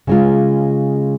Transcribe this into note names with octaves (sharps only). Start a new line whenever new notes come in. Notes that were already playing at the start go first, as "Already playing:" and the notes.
C#3 G#3 F4